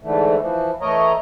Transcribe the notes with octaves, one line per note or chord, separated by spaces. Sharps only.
G#2 D3 E3 A3
E3 F3
E3 A3 A#4 C#5 D#5 A#5